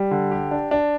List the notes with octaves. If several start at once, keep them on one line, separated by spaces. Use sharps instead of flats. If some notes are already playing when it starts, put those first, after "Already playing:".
Already playing: G3
D3
G4
D4
D4